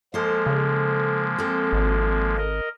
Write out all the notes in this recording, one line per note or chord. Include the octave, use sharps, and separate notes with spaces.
F3 G#3 A#3 A4 C5
C#3
C4 A4
G#1
A#4 D#5